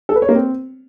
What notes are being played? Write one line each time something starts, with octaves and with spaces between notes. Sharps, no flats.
A4
B4
C#5
A#3
C4